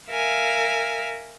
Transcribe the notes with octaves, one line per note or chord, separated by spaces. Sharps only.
A#4 E5 F5 G#5